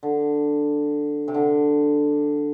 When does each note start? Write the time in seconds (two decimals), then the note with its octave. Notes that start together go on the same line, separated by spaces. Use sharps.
0.03 D3
1.28 C3
1.34 D3